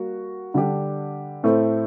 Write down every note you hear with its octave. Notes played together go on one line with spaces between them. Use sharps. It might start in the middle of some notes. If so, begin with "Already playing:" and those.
Already playing: G3 A#3 F#4
D3 G3 D4 G4
A2 A3 C4